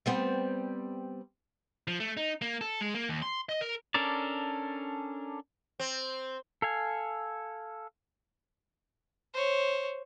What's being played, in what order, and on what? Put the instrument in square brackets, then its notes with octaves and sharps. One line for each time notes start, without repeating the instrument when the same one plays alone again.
[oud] G3 B3 C4
[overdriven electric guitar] F3
A3
D#4
A#3
A4
G#3
A#3
D#2
C6
D#5
A#4
[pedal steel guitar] C#4 D4 A4 A#4 D5
[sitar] C4
[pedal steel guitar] A4 F5 G#5
[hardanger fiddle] C5 C#5